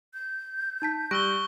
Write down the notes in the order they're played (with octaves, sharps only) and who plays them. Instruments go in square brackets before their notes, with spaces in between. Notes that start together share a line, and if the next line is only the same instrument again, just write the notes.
[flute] G6
[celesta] D#4 A5 B6
[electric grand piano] G3 [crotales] C#6 E6 G7 [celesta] F#6 A#6 D7